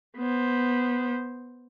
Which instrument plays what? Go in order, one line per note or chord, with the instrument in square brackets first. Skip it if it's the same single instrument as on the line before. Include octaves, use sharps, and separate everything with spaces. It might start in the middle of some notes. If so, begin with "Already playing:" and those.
[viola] B3 C5